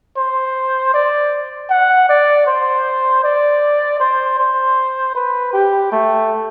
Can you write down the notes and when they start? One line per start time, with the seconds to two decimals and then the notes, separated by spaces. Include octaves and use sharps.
0.17 C5
0.94 D5
1.70 F#5
2.09 D5
2.47 C5
3.24 D5
4.00 C5
4.39 C5
5.15 B4
5.53 G4
5.92 A3